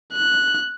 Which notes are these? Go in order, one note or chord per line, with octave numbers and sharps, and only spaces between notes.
F#6